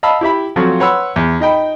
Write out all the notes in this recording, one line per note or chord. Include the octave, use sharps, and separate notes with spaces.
D#5 F5 A5 B5 E6
E4 G4 E5 B5
F3 F#3 A3 C4 F4 F#4
B4 C#5 F#5 B5 C6 E6
E2
D#4 D#5 G5 B5